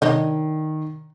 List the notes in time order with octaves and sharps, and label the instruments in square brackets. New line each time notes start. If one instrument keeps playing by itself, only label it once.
[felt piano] D#3 [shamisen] D4 C#5 D#5